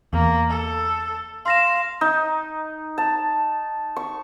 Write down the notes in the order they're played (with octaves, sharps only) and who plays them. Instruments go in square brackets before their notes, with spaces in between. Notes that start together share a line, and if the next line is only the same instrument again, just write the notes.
[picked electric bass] E2 [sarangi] A#3
[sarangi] A4
[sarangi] F5 [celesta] C6 A#6 E7
[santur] D#4
A5
C#6